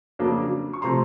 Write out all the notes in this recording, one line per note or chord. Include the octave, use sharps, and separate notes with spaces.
F2 C#3 F#3 A#3 D4
C#6
C3 F3 A3 A#5 C6